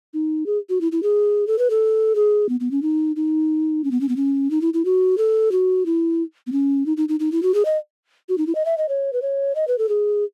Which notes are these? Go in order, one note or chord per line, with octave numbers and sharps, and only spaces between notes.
D#4
G#4
F#4
E4
E4
G#4
A4
B4
A4
G#4
B3
B3
C#4
D#4
D#4
C#4
B3
C#4
B3
C#4
D#4
E4
E4
F#4
A4
F#4
E4
B3
C#4
D#4
D#4
D#4
D#4
E4
F#4
G#4
D#5
F#4
D#4
E4
D#5
E5
D#5
C#5
B4
C#5
D#5
B4
A4
G#4